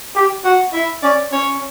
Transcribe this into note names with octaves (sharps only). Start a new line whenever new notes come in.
G4
F#4 F#5
E4 E5
C#4 D5
C#4 C#5